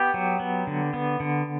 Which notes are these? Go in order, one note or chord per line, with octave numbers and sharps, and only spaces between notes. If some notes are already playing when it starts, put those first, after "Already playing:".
Already playing: B3 G4
F#3
B3
D3
B3
D3